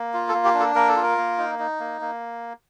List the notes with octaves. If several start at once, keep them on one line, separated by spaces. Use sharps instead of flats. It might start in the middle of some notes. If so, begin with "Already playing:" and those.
Already playing: A#3
F4
A4
A#3
G4
D4
A4
A#3 A#4
A4
F4
A#4
A#3
D#4
D#4
A#3
A#3